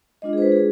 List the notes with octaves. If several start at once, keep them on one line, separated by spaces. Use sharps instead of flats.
G#3 D4 F4 D#5
G#4
C5
B4
G#4